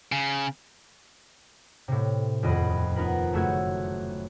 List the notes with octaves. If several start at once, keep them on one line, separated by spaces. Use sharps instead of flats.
C#3
A2 C3
D#1 F2 D#5 B5
B3 D#4 F4 A#4 B4
F#1 A3 F#4 E6 G#6